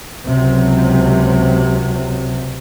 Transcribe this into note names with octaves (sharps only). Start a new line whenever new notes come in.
C#2 C3 F#3